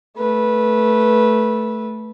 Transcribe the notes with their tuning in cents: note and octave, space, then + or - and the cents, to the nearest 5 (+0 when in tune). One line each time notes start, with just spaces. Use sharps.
A3 +0 B4 -15